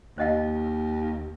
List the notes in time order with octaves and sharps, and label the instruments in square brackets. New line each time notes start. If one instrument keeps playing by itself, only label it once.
[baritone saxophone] D#2 [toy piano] C5 D#5 F5